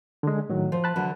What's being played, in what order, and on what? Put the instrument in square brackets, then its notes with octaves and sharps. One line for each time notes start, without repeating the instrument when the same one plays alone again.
[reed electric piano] D3 G#3
A2 D#3 F#3
[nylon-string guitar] F3
[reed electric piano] A5 B5 F#6
[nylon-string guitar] D3 E3 F#3